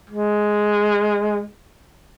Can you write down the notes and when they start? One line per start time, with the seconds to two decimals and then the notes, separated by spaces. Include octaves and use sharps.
0.10 G#3